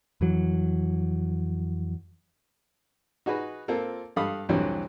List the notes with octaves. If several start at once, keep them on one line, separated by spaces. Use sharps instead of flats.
F2 E3 F#3
D#4 F#4 G#4 B4
A#3 C4 F4 A4 A#4
G2 A4 F5 B5 D#6
C2 F2 D3 E3 F#3 G3